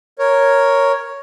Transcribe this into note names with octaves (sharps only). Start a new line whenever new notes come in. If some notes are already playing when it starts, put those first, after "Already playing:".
A#4 C#5